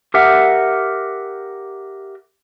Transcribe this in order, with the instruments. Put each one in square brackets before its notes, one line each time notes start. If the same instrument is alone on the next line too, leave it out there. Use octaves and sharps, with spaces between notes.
[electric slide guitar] G4 A#4 E5 F#5